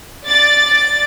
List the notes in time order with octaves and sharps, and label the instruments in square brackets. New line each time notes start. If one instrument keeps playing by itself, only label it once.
[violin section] D5 A6